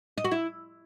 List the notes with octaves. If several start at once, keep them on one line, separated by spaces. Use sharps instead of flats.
D#5
F#4
E4